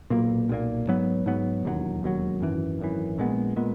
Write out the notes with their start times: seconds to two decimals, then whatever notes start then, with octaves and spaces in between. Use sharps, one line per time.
0.10 B1 A#2 A#3
0.49 B1 A#2 A#3
0.87 G#2 F#3 B3
1.26 G#2 F#3 B3
1.65 E1 D#2 D#3 F#3
2.03 E1 D#2 D#3 F#3
2.41 G#1 F#2 E3
2.79 G#1 F#2 E3
3.18 A#1 A#2 G#3 B3
3.56 A#2 G#3 B3